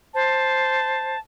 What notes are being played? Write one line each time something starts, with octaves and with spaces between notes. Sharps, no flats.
C5 A5